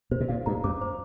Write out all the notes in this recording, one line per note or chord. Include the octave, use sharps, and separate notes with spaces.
B2 C5
C3
A#2 F5
G2 A#5
F#2 D6
C5